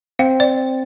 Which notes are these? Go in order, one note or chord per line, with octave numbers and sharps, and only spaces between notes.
C4 F5
D5